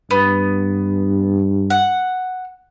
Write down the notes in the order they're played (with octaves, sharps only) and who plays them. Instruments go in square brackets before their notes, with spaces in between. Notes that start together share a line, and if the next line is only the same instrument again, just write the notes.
[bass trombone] G2 [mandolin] B3
[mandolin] F#5